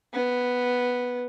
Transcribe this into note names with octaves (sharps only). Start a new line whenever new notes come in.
B3